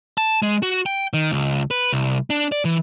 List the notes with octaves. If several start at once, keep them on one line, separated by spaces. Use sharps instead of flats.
A5
G#3
F#4
G5
D#3
C#2
B4
C2
D4
D5
E3